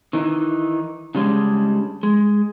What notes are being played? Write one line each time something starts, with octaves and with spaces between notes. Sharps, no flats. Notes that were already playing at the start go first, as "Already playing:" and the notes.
D#3 E3 D#4
C#3 G3 G#3 C#4 D4
G#3